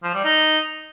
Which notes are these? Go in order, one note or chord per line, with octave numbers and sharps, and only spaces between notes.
F3
G3
D#4